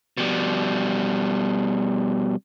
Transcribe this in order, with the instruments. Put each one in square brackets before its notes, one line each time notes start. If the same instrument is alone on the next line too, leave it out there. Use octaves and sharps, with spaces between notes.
[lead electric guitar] B2 G3